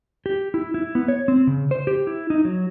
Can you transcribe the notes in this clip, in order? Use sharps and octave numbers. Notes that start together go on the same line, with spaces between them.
G4
E4
E4
B3
C#5
C4
C#3
C5
G4
E4
D#4
F#3